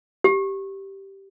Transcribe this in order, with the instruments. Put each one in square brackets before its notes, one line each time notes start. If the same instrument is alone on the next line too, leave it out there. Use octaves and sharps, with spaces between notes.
[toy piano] G4